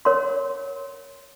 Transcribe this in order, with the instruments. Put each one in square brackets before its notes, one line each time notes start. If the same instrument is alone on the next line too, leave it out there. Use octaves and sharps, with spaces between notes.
[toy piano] A#4 C#5 F#5 C6